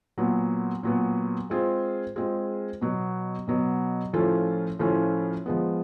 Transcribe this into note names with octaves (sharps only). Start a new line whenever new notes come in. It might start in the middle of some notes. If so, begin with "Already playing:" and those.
A#2 F#3 B3
A#2 F#3 B3
G#3 C4 F4 G#4
G#3 C4 F4 G#4
B2 F#3 B3
B2 F#3 B3
A2 F3 A3 C#4 F4
A2 F3 A3 C#4 F4
F3 G#3 B3